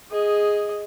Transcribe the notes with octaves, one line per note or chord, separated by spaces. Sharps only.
G#4 D#5